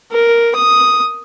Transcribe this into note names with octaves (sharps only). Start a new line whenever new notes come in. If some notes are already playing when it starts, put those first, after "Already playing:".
A#4
D#6